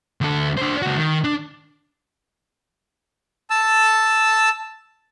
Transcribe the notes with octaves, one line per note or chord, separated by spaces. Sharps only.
D2 A4
D4 C5
C#2 F#4
D#3
D4
A5 E6